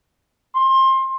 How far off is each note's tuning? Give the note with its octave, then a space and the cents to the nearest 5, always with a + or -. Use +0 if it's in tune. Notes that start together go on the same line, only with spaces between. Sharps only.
C6 +25